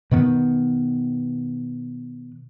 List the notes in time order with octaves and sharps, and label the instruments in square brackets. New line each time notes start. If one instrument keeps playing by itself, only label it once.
[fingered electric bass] B2 D#3 B3